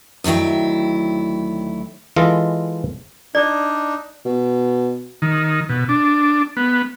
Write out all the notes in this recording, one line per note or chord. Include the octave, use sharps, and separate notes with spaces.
D2 D#3 F#3 E4 G5
E3 G#3 F4 A4 D#5
D4 D#4 D5
B2
D#3
B2
D4
B3